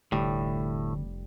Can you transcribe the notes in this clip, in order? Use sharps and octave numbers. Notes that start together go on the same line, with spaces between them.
F1 D2 A2 G3